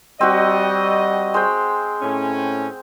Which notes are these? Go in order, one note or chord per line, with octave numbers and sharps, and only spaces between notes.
G3 C4 F#4 D#5
G#3 C5 G5
A2 C#4